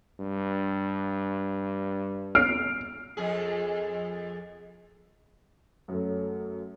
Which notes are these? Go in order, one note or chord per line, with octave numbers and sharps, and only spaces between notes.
G2
F6 C7 D7
F2 G#4
F#2 F#3 A3